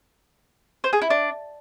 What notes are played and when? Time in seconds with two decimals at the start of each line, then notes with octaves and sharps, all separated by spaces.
0.84 C5
0.93 G#4
1.02 E4
1.10 D4